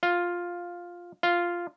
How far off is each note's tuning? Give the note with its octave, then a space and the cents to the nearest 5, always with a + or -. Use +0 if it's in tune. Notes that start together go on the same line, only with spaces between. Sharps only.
F4 +5
F4 -5